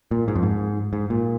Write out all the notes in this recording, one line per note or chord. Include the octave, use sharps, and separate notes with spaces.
A#2
G#2
F2
G#2
G#2
A#2